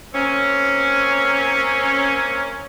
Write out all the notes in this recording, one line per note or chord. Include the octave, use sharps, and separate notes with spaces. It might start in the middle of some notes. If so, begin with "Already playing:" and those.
A#3 C4 C#4